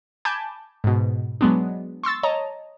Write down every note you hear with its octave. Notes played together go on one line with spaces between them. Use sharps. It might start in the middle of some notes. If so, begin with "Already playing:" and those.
G#5 A5 B5 D6 G6 G#6
G#2 B2
F#3 G#3 B3 D4
C6 C#6 E6 A6
C#5 D#5 A5 A#5